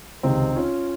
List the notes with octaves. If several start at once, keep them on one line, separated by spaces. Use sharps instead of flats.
C#2 C3 D#3 C4 D#4
C#4 F4